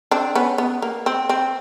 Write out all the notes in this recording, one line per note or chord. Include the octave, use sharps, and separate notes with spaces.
C4 D4
B3 C#4
B3
A#3
C4
C4